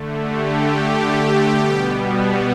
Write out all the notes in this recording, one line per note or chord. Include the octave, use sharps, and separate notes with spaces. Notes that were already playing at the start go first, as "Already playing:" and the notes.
Already playing: D3 A3
G4
B2 G3 B3